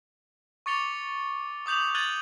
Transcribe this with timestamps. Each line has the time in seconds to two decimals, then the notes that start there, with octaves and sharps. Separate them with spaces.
0.66 C#6 D6 A6 C#7 F7 G7
1.66 D6 D#6 G6 F7 F#7
1.95 F#6 G#6 A6 D#7 F#7 G7